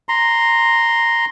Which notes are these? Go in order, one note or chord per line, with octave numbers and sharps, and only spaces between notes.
A#5 C6